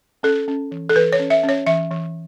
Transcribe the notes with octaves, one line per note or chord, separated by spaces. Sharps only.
C#4 A4
C#4
E3
A4
E3 B4
C#5
C#4
E5
C#4
C#5
E3 E5
E3